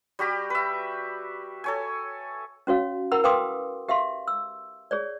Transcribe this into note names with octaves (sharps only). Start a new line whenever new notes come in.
G3 F#4 G4 B5
B4 E5
A4 C#5 G#5
C#4 F#4 C#5 F5
E4 A#4 F#5 B5 E6
B4 F5 G5 C6 D6 D#6
G4 E5 F5 C6
E6
G#4 C#5 D5